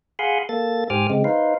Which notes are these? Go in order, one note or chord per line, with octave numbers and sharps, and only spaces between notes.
G#4 F5 F#5 G#5 B5 C6
A#3 A4 A6
G#2 G4 C5 G#5 D6 F6
C#3 G#3 C4
D#4 B4 C5 F5